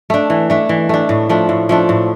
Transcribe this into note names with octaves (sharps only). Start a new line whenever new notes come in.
A3 D4
E3
A3 D4
E3
A3 D4
A2
F3 A3 D4
A2
F3 A3 D4
A2